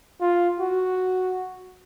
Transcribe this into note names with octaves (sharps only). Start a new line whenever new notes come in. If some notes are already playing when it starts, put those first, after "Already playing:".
F4
F#4